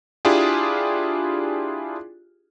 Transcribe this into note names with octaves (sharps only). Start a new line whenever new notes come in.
D4 E4 F4 G4 G#4